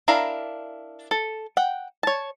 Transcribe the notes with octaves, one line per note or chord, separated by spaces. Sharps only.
D4 E4 A#4 F5 A#5
A4
F#5 G5
C#5 A5